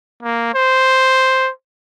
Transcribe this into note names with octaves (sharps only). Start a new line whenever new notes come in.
A#3
C5